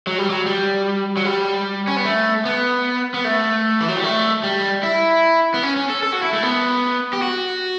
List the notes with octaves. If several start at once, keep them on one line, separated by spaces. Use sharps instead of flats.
F#3
G3
F#3
G3
F#3
G3
C#4
B3
A3
B3
B3
A3
E3
F#3
G3
A3
G3
E4
B3
C#4
C#4
A4
A4
F#4
E4
A3
B3
G4
F#4